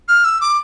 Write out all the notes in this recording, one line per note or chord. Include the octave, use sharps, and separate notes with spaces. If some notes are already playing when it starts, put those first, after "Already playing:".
F6
E6
D6